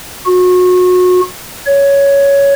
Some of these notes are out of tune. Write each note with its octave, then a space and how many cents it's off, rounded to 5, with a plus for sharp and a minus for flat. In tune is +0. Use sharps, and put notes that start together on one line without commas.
F#4 -30
C#5 +10